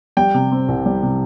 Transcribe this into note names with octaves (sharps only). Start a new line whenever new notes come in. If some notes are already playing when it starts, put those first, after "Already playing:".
G3 G5
C3
C4
C2
G3
C3